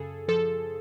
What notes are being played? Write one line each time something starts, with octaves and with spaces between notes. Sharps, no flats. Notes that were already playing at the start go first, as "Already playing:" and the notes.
Already playing: F#2 C#3 G#4 A4
F3 A4